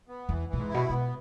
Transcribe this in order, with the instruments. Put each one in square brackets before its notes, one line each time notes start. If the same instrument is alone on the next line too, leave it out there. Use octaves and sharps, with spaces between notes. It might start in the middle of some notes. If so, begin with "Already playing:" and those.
[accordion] B3
[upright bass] E2 [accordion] E3
[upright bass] A#2 [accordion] E3
[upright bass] G#2
[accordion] E4
[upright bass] B2
[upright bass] B2 [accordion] B3